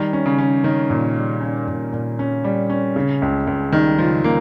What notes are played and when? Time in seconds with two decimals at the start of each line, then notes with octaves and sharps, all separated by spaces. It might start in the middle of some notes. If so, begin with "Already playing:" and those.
Already playing: D#3 G3
0.13 C#4
0.26 C#3
0.38 C#4
0.64 D#3 C#4
0.90 A#2
1.16 G3
1.41 C#4
1.68 A#2
1.93 A#2
2.19 C#4
2.44 G3
2.69 C#4
2.96 C#3
3.22 C#2
3.47 C#2
3.72 D#3 G3
3.98 C#3 F3
4.24 C#3 A#3